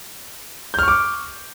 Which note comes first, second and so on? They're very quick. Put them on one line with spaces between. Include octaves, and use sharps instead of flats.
G6 F6 C#6 D6